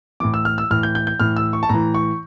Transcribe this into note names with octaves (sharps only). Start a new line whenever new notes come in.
A2 E3 D6
E6
F6
E6
A2 E3 F6
G6
G6
G6
A2 E3 F6
E6
C#6
A5
A2 E3 A#5
C#6